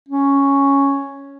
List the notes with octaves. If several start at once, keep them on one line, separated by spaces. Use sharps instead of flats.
C#4